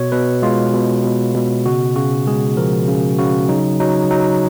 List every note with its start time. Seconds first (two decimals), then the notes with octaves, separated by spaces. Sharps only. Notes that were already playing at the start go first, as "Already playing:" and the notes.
Already playing: B2 C#5
0.12 B2 B4
0.42 G#3 F4
0.74 B2
1.04 B2
1.35 B2
1.66 C#3 F#4
1.96 C#3 F#4
2.27 G#3 G#4
2.57 F3 A#4
2.88 C#3
3.18 C#3 F#4
3.49 F#3 D#4
3.80 F#3 D#4
4.11 F#3 D#4